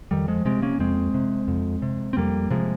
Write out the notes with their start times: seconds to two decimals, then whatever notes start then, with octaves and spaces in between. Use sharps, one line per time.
0.11 F2 D#3 G3
0.28 F3 G#3
0.45 C3 G#3 C4
0.62 A#3 C#4
0.79 F2 G#3 C4
1.14 C3
1.48 F2
1.82 C3
2.13 C4
2.17 F2 G3 A#3
2.50 C3 F3 G#3